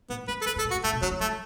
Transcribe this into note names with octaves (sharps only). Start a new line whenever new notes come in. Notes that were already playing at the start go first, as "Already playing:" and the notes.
A2 B3
F#2 B4
A4
E2 B4
F#2
A4
A2
F#4
F#2
A2 A3
B2
C#3 F#3
E3
F#3 A3